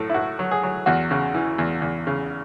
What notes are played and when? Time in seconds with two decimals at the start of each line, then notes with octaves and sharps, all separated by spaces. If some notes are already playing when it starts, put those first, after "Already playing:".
Already playing: A2 F#3 A4
0.10 E4
0.14 A2 F#4
0.39 F#3
0.51 G#4
0.63 F#3
0.86 E2 F#4
1.11 C#3
1.34 E3
1.58 E2
1.82 E2
2.07 C#3